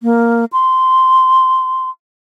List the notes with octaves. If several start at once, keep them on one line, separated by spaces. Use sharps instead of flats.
A#3
C6